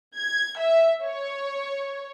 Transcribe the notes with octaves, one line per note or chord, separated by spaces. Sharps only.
G#6
E5
C#5